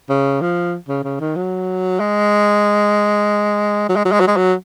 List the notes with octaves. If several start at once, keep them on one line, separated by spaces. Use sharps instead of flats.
C#3
F3
C#3
C#3
D#3
F#3
G#3
F#3
G#3
F#3
G#3
F#3
G#3
F#3